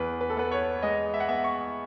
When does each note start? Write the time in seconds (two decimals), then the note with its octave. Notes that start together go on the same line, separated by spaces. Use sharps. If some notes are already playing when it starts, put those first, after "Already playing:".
Already playing: E2 B4
0.21 B4
0.30 A4
0.37 B3 B4
0.52 C#5
0.83 G#3 D#5
1.14 E5
1.20 F#5
1.29 B3 E5
1.44 C#6